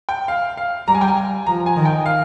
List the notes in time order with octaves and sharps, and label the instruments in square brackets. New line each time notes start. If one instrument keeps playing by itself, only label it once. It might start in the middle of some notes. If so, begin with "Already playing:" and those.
[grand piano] G5
F5
F5
[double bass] G3 [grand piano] A#5
[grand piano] G#5
G5
G#5
[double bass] F3 [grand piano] A#5
[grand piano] G#5
[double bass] D#3
[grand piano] G5
F5